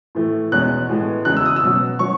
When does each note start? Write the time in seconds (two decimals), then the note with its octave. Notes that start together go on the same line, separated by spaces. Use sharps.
0.15 A2 E3 A3
0.52 E2 B2 G#3 C#4 F#6
0.89 A2 G#3 B3
1.25 E2 C#3 G#3 F#6
1.37 E6
1.46 D#6
1.56 E6
1.63 B2 F#3 C#4
1.99 F#3 C#4 C#6